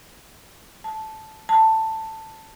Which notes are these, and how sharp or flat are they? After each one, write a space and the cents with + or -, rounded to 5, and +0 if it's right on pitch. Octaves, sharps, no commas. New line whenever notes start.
A5 -10
A5 +10